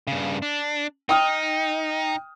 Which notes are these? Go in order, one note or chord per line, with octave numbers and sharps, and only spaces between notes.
G2 C#3
D4
D#4 G5 D#6 F6